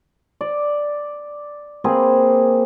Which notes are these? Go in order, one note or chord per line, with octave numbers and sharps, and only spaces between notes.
D5
A#3 C4 G#4 B4